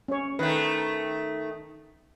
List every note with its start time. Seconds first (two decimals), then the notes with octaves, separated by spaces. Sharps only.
0.08 C#4 C#5
0.39 D#3 A3 B4